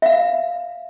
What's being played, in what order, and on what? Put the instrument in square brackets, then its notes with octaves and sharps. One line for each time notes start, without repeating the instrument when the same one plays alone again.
[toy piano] E5 F5